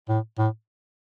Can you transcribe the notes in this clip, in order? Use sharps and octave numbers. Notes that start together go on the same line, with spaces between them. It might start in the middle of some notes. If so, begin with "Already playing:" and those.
A2
A2